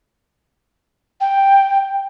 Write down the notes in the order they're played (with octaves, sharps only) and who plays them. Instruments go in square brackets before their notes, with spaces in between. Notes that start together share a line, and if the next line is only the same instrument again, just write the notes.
[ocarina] G5